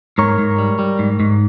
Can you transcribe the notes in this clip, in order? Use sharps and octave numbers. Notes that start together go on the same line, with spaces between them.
G#2 A#4 C#5
G#2
G3
G3
G#2
G#2